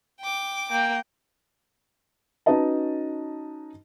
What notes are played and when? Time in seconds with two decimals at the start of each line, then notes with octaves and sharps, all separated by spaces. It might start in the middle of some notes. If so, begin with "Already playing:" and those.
0.20 G5 D6
0.71 A#3 G5
2.46 C#4 D#4 F#4 B4 D#5 A5